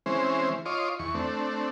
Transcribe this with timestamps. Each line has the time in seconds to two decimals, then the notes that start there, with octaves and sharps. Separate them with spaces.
0.06 E3 G#3 C4 C#4 C5
0.66 F4 C#5 D#5 C6 D6
0.99 E2 C#6
1.15 A3 C4 D4